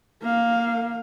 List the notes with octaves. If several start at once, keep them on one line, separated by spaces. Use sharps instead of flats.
A#3 F5